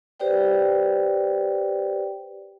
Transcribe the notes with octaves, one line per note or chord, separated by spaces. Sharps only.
G4 B4 C5 D5 G5